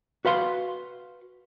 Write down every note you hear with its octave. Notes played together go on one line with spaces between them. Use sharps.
F#4 B4 F5 C6